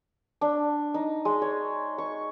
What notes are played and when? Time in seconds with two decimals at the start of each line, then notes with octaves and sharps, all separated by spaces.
0.41 D4
0.94 D#4
1.25 G#3
1.42 C#5
1.98 C#6